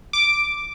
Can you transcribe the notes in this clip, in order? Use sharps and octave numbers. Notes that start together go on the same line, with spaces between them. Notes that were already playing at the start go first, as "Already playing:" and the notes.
D6